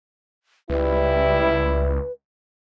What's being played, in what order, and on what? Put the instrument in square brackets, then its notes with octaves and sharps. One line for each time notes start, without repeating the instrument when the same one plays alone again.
[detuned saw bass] C#2 [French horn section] G3 E4 [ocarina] B4